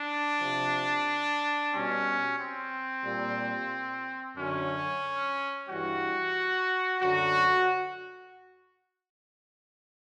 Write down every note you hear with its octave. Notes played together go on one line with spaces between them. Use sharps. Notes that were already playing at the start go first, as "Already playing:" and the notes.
Already playing: D4
C3 F3
B2 G3 C#4
C4
A#2 G3
F#2 D3 F#3 C#4
G2 E3 G3 F#4
F#2 D3 F#3 F#4